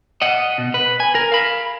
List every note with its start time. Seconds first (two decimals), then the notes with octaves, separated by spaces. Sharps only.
0.22 D#5 F#5
0.58 B2
0.74 B4
1.00 G#5
1.15 A#4
1.32 F5 B5